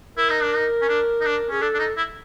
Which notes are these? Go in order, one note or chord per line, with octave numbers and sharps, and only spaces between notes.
E4 A#4
D#4
D4
D#4
C#4
D4
D#4
D4
C#4 G#4
D4 A4
D4
D#4
E4